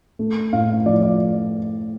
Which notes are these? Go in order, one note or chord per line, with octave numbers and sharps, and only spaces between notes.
A3
A2 F5
F3 D5
D5